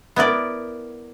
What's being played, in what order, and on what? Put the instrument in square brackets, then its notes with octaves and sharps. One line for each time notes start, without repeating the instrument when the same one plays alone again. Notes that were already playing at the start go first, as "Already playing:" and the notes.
[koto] B3 E4 A#4 D5